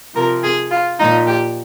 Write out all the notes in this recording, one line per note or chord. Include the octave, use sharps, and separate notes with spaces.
C3 F3 A#4
G#4
F4
A#2 F3 D#4
G4